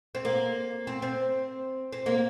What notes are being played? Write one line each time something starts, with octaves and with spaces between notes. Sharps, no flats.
C4
A#3
C4
C4
C4
A#3